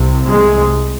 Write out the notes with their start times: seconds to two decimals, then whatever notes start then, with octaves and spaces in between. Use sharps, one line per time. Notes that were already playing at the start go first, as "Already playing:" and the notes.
Already playing: C2 C3
0.29 G#3